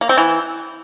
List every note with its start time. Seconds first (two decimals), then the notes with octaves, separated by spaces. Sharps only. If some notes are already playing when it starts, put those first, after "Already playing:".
0.01 A#3
0.09 C4
0.17 E3